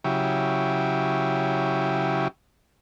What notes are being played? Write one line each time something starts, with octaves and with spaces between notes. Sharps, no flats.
C#3 F#3 E4 G4